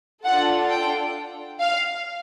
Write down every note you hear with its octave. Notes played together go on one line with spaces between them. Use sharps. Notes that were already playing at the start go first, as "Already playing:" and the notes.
D4 F4 A4 F#5
G5
F5